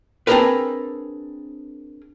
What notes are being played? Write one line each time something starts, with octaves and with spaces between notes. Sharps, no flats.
C4 D4 D#4 G#4 A#4 B4